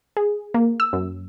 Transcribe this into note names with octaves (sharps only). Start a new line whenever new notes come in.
G#4
A#3
E6
F#2